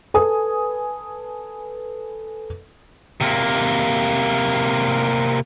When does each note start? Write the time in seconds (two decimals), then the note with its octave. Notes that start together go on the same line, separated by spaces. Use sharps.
0.14 A4 B4 G#5 D#6
3.21 C3 A#3